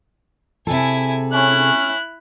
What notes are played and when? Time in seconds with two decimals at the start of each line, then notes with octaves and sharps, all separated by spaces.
0.67 C3 E4 G#4 A4 G#5
1.33 C#4 E4 F#6